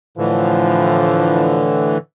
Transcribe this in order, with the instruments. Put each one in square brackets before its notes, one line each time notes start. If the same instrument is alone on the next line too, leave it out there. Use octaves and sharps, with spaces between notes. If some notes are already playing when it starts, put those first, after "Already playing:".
[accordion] A2 D3 E3 [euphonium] F3